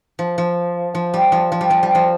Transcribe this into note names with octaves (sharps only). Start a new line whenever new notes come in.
F3
F3
F3
G3
F3
F3
G3
F3
G3
F3